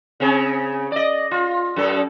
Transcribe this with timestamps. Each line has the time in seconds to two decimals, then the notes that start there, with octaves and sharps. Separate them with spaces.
0.20 C#3 C4 G#4
0.92 D5 D#5
1.31 F4
1.76 F#2 A4